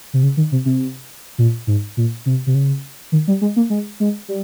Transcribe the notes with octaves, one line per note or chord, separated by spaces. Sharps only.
C3
C#3
D#3
C3
C3
A#2
G#2
A#2
C3
C3
C#3
D#3
G3
G#3
A#3
G#3
G#3
G3